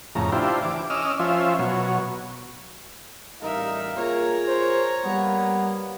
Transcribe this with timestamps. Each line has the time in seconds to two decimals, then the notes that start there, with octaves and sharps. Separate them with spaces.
0.15 F2 A2 C#3 A#5
0.32 D4 E4 F4 G4 C5
0.63 E3 D6
0.90 C#4 D#5 D6 E6 F6
1.20 F3 C#4 F4 C5 E5
1.59 B2 F#3 C#5
3.42 A1 G3 D#4 A#4 E5 F5
3.96 A#3 F4 G#4 A#4 C#5 A#5
4.47 C5
5.04 G3 A#3 B3